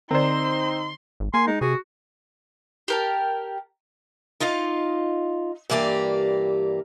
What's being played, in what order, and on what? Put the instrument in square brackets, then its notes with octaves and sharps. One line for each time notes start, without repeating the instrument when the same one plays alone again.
[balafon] D3 D5 [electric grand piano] C4 C5 [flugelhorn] D#4 [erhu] C6
[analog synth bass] G#1
[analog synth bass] A#3 [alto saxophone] G#5 [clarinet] C6
[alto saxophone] G#3 [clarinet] D#4
[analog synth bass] C3 [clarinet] F#4 [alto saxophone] G#4
[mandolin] G4 A#4 A5
[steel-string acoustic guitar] D#4 F4 D#5 F5
G2 E3 A#3 G4 D5